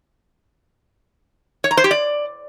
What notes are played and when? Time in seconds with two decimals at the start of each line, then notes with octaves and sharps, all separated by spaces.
1.64 C#5
1.71 A#5
1.77 C5
1.84 G4
1.91 D5